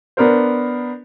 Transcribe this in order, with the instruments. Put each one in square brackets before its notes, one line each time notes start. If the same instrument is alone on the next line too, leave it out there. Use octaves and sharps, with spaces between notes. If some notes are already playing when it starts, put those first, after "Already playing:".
[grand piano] B3 D4 A#4 C5